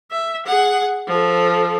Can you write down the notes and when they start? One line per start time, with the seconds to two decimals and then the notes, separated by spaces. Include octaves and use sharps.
0.11 E5
0.46 G#4 F#5
1.07 F3 A4